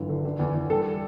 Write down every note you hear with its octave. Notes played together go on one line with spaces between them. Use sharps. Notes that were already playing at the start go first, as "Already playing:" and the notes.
Already playing: G1 E3 F#3
D3
D3
E2
E2
G3 A4